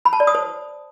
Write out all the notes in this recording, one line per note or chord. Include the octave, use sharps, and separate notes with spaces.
B5
A5
D5
D#6
C5